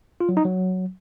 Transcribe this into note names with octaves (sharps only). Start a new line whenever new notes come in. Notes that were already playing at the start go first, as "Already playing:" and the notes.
F4
F#3
D#4
F#3